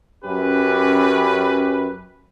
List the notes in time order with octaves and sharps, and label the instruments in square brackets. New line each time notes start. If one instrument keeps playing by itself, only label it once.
[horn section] F#2 C#4 G4 B4